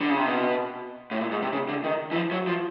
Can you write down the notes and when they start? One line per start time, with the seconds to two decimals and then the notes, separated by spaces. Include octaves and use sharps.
0.01 D3
0.09 C#3
0.17 C3
0.26 B2
1.11 A2
1.21 A#2
1.31 G#2
1.42 C3
1.53 C#3
1.69 D3
1.84 D#3
2.12 E3
2.16 F3
2.31 F#3
2.47 F3